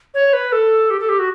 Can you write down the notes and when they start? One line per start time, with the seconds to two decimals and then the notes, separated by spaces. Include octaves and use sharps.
0.14 C#5
0.33 B4
0.52 A4
0.90 G4
1.00 A4
1.09 G4
1.19 F#4